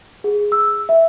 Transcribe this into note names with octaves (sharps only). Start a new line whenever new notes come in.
G#4
E6
E5